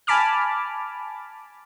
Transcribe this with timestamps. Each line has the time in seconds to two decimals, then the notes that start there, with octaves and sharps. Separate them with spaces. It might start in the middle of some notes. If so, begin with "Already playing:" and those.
0.07 G#5 A5 B5 D6 F6